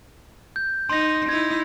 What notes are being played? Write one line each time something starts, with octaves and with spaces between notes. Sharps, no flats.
G6
D#4 C6 A#6
D#4 E4 G#6